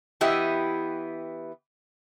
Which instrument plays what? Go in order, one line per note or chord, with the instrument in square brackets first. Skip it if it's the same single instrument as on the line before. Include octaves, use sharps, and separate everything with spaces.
[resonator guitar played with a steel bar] E3 B3 E4 G4 D#5